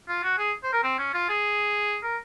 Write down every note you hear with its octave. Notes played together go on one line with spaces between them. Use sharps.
F4
F#4
G#4
C5
A#4
C4
C#4
F4
G#4
A#4